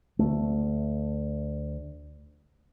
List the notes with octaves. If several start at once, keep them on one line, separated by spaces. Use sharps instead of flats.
D2 A3